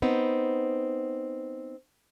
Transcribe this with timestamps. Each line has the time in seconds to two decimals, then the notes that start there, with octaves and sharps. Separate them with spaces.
0.02 B3 C4 D#4